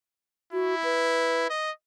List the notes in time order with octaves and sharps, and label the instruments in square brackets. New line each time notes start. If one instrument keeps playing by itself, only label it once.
[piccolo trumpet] E4 [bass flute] F#4
[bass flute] B4
[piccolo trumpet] D#5